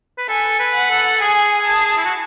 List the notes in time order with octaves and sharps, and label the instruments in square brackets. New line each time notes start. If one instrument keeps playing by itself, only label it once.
[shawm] B4
[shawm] A4 [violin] G#5
[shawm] B4
[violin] F#5
[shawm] A4
[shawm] G#4 [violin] G#5
[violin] A5
[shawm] E4
F#4